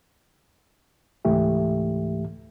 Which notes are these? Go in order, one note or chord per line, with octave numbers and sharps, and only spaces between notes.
C#2 G#2 E3 A3 G4 E5